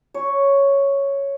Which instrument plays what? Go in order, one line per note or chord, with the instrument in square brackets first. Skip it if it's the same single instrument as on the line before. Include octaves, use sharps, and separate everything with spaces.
[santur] C#5